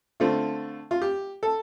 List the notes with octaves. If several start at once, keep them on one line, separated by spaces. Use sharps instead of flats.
D3 A3 C4 F4
F4
G4
A4